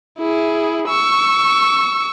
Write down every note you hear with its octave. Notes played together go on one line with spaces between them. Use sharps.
E4 G#4
C#6 E6